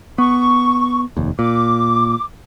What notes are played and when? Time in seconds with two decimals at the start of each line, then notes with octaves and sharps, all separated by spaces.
0.18 B3 C#6
1.17 F1 D#2
1.39 A#2 D6